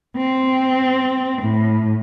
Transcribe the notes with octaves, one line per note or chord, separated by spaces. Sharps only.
C4
A2